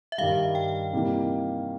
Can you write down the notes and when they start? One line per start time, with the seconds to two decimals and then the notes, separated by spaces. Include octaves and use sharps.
0.12 E5
0.18 G2 D#3 G3 F5
0.55 G5
0.93 C3 E3 G3 A#3 D#4